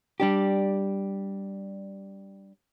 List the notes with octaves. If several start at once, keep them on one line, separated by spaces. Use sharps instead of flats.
G3 D4 G4